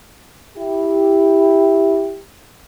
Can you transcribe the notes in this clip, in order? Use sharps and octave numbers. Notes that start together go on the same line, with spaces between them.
E4 G4